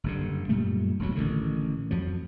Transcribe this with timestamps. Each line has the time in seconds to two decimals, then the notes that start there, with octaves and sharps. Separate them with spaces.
0.04 F#1 G2 D3
0.49 F#2 A#2 G3 A3
0.99 E1 D2 F#3
1.15 A1 A#2 D3 D#3
1.91 F2 F3 F#3